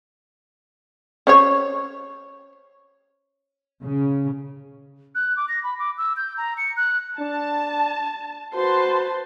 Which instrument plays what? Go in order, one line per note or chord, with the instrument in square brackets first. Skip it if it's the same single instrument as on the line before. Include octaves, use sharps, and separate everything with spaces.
[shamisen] C#4 C5 C#5
[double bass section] C#3
[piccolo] F#6
D6
A#6
B5
D6
E6
G6
A#5
C#7
F#6
[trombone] D4 [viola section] A5
[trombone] F#4 [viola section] B4 A5 C6 [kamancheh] C5